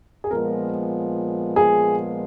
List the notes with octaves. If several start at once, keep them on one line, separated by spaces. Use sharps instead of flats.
G#4
A#2 F3 G#3 B3 A#4
G#4